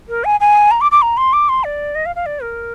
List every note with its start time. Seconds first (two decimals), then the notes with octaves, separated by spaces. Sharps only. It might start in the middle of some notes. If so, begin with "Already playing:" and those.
0.09 A#4
0.24 G#5
0.40 G#5
0.71 A#5
0.81 D6
0.92 D6
1.02 A#5
1.17 C6
1.33 D6
1.49 C6
1.64 D5
1.95 D#5
2.06 F5
2.16 F5
2.26 D5
2.42 A#4